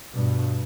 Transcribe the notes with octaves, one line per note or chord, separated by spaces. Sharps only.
G2 B2